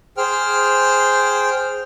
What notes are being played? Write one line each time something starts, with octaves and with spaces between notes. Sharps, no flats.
G#4 C5 G5 F6